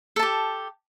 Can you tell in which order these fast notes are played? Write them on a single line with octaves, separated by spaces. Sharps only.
A4 A5 G4